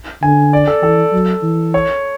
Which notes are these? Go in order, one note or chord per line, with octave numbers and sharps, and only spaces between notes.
D3 G#5
D5
A4
E3 A4
F#3
E3
C#5